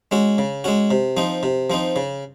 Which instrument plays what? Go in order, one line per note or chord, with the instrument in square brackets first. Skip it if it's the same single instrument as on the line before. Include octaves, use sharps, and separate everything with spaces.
[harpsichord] G#3 C#4 F#4
C#3
G#3 C#4 F#4
C3
F3 C4 D#4
C3
F3 C4 D#4
C#3